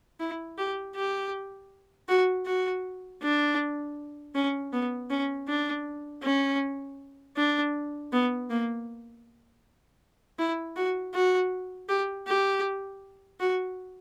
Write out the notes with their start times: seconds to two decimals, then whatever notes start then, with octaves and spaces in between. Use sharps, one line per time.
0.20 E4
0.58 G4
0.95 G4
2.09 F#4
2.46 F#4
3.22 D4
4.35 C#4
4.73 B3
5.10 C#4
5.48 D4
6.23 C#4
7.37 D4
8.12 B3
8.50 A#3
10.39 E4
10.76 F#4
11.14 F#4
11.89 G4
12.27 G4
13.40 F#4